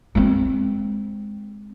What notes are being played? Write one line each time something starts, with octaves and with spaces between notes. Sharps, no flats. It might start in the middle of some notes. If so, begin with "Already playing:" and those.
G#3 C4